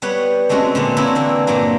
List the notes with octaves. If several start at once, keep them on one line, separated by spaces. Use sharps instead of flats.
G3 B3 B4 C#5 F#5
G#3 A3 C4 C#4 F#4
A#2 D3 B3 C4
A#3 C4 D4 E4 C#5 G#5
D3 E3 A#3
G2 A#2 F#3 A#3